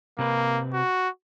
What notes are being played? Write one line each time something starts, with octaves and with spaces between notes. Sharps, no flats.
C3 A#3 C4 B4
F#4